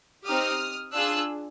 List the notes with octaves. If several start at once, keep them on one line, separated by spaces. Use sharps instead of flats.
C4 D#4 G4 D#6 F6
D4 F4 G#4 E6 F#6